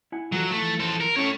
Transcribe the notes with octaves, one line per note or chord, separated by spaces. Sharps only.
E4 F#5 G#5
E3 F#3 F4 A4
E3 F3 A3
A4 C5
A#4
A3 C#4 A4 C#5